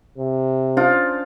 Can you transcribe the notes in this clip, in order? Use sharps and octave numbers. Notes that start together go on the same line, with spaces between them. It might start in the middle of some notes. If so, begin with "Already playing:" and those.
C3
C#4 D4 F4 C5